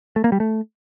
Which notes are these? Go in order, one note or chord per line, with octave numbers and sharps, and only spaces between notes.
A3
A#3
G3
A3